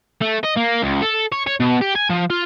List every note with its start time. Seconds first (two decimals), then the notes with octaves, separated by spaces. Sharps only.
0.22 A3
0.44 D#5
0.57 A#3
0.83 C#2
1.02 A4
1.32 C#5
1.47 C#5
1.60 B2
1.81 G4
1.95 G#5
2.10 F3
2.30 F4